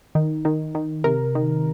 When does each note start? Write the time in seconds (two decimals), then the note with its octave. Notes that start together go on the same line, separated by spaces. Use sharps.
0.15 D#3
0.45 D#3
0.75 D#3
1.04 C3 A#4
1.35 D#3